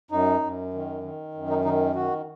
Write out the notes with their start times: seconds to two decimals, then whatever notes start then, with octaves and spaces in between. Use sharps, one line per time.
0.11 F#2 D#4
0.41 F#2
0.73 D#3
1.04 D#3
1.34 F#2
1.50 D#4
1.65 D#3 D#4
1.95 D#3 F#4